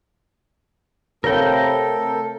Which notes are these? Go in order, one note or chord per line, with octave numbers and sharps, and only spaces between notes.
C3 A3 A4 A#4 C#5 F5 G5 B5